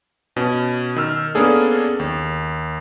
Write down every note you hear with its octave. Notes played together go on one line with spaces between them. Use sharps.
B2 C#4
D#3 E6 F6
A#3 B3 C#4 D4 G#4 A4
D#2